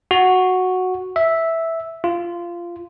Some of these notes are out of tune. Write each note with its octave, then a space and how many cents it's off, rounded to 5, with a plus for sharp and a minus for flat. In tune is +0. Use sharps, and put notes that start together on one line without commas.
F#4 -5
E5 -5
F4 -15